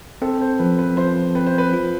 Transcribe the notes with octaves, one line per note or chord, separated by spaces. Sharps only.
C4 A4
C5
F3 B4
B4
F3 C5
C4 B4
C5
B4
F4